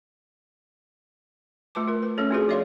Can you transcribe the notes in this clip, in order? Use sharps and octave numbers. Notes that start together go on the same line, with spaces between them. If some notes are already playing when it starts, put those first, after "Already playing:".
A3 F4 B4 A5 D6
F4 A#4
B4
A3 C#4 A4 C#5
C4 D4 F4 F#4 G#4 B4
F3 C#5 D5 E5 F5 C6